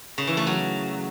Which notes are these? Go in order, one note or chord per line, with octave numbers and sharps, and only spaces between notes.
C#3
E3
A3
F#3